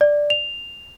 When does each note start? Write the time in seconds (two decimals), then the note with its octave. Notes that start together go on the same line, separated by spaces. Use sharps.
0.01 D5
0.30 F7